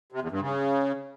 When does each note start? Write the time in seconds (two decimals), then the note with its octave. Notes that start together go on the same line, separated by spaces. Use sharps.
0.12 C3
0.22 E2
0.31 G2
0.40 C#3